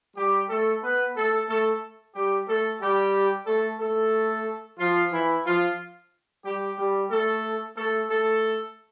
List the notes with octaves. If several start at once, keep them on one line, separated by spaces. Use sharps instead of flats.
G3 G4
A3 A4
B3 B4
A3 A4
A3 A4
G3 G4
A3 A4
G3 G4
A3 A4
A3 A4
F3 F4
E3 E4
F3 F4
G3 G4
G3 G4
A3 A4
A3 A4
A3 A4